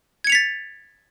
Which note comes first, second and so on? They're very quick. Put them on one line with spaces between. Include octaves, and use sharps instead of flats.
G#6 C#7 F7 B6 A6